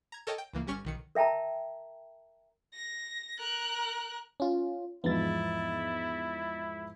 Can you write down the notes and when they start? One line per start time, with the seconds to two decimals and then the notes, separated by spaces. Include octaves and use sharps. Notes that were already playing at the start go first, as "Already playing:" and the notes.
0.12 A#5 G#6
0.27 A4 A#4 C#5 D#5 G5 A5
0.38 G5
0.53 C#2 E3 A#3
0.67 G1 G3 C#4 C#6 F6 G#6
0.85 B1 D#3 C#7
1.15 A#4 E5 G5 A5 A#5
2.73 A#6
3.39 A#4 F#6
4.40 C#4 F4
5.04 E2 G#2 F3 B3 E4 A6